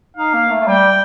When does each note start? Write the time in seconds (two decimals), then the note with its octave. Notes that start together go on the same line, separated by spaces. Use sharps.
0.17 D#4 F5
0.34 A#3
0.50 A3
0.61 A3
0.68 G3 G5